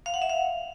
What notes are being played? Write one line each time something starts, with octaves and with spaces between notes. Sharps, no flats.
F5
F#5
E5
F5